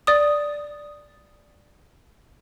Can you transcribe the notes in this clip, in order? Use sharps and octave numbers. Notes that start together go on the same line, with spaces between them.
D5 D#6